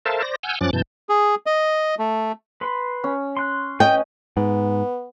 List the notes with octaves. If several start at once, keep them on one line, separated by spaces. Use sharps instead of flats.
A4 A#4 C5 E5 F5 A5
C5 D5 A#6
F#5 G#5 E6 F6 G6
F#2 F3 C#4 D6 F#6 A6
F#2 B2 E3 A5 G6
G#4
D#5
A3
B4 B5 C6
C#4
C6 F#6
C#4 B4 C#5 D#5 G5
G#2 B3